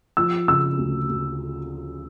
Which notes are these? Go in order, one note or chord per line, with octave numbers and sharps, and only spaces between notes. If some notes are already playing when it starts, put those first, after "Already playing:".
F3 E6
C#3 E6
D2
D2